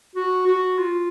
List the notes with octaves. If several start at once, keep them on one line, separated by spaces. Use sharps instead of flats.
F#4
F#4
F4